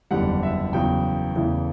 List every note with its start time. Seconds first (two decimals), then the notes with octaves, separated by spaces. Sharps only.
0.11 F#1 E2 D3 G3 F#5
0.43 E5
0.73 E2 C#3 F#3 G5
1.36 E2 C#3 E3 A3